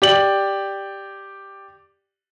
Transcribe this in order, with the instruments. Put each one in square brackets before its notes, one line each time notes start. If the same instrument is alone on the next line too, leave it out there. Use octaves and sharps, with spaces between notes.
[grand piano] G4 D5 F#7